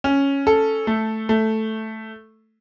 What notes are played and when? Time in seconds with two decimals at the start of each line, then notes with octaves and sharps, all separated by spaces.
0.04 C#4
0.47 A4
0.87 A3
1.29 A3